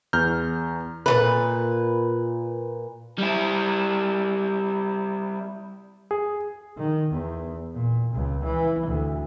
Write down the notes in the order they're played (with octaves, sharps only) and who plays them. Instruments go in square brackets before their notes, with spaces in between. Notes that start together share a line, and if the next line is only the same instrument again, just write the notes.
[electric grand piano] E2 A#5 F6 G6
[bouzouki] A#2 E3 B4
[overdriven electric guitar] G3 E4
[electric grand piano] G#4
[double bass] D#3
E2
A#2
C#2
E3
D2